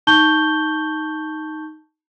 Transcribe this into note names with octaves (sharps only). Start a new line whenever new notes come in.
D#4 A5 C#6 G6 G7